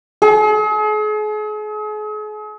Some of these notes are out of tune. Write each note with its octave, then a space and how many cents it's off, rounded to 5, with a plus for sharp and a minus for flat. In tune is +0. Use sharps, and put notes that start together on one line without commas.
G#4 +40